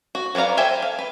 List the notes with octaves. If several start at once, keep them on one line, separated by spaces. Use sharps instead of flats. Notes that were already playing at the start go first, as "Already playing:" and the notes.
F#4
F#3 B4 D5 F5 A#5
A4 C5 E5 G5 G#5
F5
B4